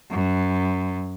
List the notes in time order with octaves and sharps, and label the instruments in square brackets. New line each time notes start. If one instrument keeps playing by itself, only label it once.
[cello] F#2